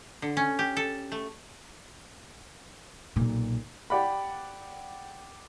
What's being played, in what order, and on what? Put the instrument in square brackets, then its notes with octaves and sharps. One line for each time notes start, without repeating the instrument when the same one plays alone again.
[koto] D3
C#4
G4
A4
A3
[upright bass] B1 A#2
[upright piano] G4 D5 F#5 B5